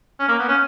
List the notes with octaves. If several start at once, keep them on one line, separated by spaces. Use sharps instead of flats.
C#4
A#3
B3
C#4